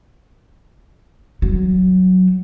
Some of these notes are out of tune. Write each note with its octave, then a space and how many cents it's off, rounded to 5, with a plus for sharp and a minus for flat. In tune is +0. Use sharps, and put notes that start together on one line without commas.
F#3 +0